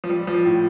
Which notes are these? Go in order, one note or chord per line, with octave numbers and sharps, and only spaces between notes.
F3
G3
F3
A2